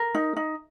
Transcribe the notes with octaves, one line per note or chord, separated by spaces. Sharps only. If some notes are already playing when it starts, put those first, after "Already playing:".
Already playing: A#4
D#4
D#4